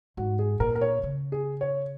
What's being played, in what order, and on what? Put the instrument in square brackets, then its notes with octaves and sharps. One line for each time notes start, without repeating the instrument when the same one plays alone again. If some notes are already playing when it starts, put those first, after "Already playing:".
[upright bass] G#2 [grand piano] F#4
[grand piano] G#4
[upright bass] A#2 [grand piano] A#4
[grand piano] A#4
C#5
[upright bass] C#3
[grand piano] G#4
C#5